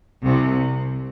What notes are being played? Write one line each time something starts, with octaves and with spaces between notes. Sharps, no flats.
C2 C3